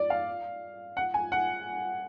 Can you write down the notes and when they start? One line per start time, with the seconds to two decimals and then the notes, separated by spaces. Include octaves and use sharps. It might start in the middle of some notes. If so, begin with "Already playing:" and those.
Already playing: D5
0.10 F5
0.97 F#5
1.14 G#5
1.32 F#5